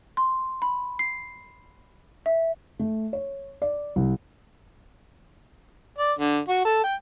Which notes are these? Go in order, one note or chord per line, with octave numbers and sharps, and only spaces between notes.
C6
B5
C7
E5
A3
C#5
D5
C2
D5
D3
F#4
A4
G5